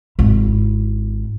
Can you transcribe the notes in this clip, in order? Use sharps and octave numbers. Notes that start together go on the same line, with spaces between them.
G#1 E4